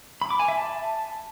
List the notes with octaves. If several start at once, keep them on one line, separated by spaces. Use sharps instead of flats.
B5
D6
G#5
E5
A5